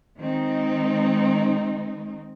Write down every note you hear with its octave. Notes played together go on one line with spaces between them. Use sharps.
D#3 G#3 C4 D#4